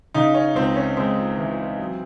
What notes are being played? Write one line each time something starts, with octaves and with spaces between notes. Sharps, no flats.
C#3 D#4
C#4
C#2 C4
C#4
G#3 C4
E3
F#3